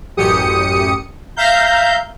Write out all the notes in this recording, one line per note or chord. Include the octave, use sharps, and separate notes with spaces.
A1 F#2 G4 D#6 C#7
E5 F5 A#5 G6